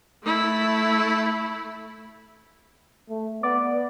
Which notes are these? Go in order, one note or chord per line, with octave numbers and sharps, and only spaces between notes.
A3 E4
A3
B3 D5